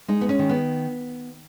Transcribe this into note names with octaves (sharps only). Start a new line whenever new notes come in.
G#3 D#4
B3
C#4
D#3
B3